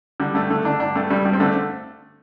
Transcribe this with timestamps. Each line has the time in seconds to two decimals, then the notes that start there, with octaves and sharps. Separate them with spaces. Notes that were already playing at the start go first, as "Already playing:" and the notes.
0.20 D3 G3
0.34 G2 A3
0.50 D3 A3
0.65 D3 D4
0.80 G2 D4
0.95 G2 A3
1.10 G2 G3
1.25 G2 G3
1.33 C4
1.40 D3 A3